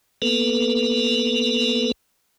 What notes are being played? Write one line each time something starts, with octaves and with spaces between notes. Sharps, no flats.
A#3 B3 A4 B4